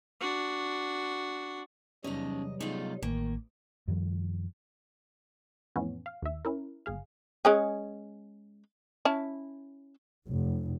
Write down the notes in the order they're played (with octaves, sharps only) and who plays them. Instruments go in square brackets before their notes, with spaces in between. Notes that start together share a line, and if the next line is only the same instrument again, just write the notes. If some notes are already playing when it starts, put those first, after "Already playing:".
[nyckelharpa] D4 F#4
[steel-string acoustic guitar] E2 D#5 [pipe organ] C3 F#3 G3 [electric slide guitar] C#4 D#4
[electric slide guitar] B3 G#4 A4 [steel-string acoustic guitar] D#4 F4
[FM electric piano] A1 [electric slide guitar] D#3 [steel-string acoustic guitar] A#3
[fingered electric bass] F#2 D#3 F3 G3
[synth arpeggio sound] F2 A2 E3 B3 C#4
F5
D#2 E5
C#4 E4 A#4
G1 G#4 F5
[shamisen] G#3 C#4 G#4
C#4 E4 A5
[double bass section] F1